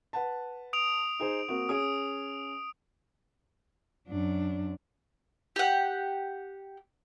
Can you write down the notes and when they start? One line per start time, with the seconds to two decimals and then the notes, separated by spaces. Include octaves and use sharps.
0.13 B4 F#5 A5
0.73 D#6 D7 F7
1.19 D#4 G#4 C5
1.48 A#3 C4 F#4
1.69 C#4 G#4 D#6 D7
4.09 F#2 D4
5.56 G4 F#5